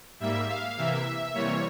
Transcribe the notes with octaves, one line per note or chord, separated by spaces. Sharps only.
G#2 G3 A#3 E5
F5
C3 E3 A#3 E5
C3 E3 G3 A#3 C#5